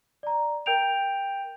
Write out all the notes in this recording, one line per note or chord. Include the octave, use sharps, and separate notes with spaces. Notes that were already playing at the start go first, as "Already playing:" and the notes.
D5 A#5
A#4 G5 G6 D7 F7